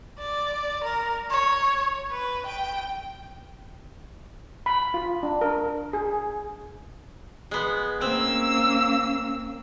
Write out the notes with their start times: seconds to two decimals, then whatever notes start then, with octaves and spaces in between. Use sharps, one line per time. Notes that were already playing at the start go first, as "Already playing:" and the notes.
0.19 D5
0.84 A#4
1.30 C#5
2.12 B4
2.46 G5
4.66 B5
4.94 F4
5.23 D4
5.41 A#4
5.93 G#4
7.51 G#3 B3
8.01 A#3 C4 C#4 E6